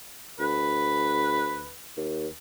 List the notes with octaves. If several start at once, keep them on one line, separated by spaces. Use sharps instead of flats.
D2 B4
D#2